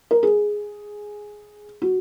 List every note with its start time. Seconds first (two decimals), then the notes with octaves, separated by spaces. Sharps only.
0.11 A#4
0.23 G#4
1.82 F#4